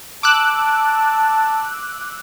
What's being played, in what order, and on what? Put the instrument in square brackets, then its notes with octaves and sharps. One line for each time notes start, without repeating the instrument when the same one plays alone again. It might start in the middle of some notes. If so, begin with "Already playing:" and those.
[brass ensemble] A5 [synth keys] D6 E6 F#6